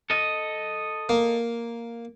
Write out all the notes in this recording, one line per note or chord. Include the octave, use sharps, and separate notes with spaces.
A4 D#5
A#3